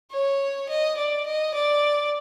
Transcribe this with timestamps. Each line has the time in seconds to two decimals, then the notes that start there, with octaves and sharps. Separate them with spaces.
0.11 C#5
0.69 D#5
0.97 D5
1.26 D#5
1.54 D5